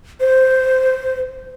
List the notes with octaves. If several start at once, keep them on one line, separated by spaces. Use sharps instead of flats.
C5